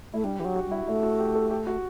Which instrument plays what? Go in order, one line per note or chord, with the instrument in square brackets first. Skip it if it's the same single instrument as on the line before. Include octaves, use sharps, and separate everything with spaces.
[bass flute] A3 [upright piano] E4
[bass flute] G3 [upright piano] D4
[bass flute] E3 [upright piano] G4
[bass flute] F#3
[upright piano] F#4
[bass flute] G3
[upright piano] E4
[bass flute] A3 [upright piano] E4
[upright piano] F#4
G4
A4
G4
F#4